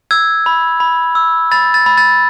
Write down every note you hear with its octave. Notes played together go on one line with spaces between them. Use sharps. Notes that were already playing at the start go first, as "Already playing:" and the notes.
E6 G#6
B5
B5
E6
B5 A6
A6
B5
A6